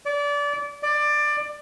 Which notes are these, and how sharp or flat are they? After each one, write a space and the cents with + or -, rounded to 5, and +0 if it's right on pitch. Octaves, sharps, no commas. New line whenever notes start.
D5 -25
D5 +20